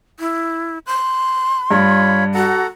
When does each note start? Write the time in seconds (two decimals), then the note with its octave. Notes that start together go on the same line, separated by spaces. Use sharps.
0.20 E4
0.87 C6 F#6
1.71 G2 F4 C#5 B5
2.34 F#4 A4 F#5 A#5